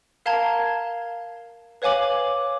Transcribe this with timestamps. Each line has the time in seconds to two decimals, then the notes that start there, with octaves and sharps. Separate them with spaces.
0.26 A#4 F5 A5 A#5 G#6 G7
1.82 B4 C#5 F5 G#5 D6 F#7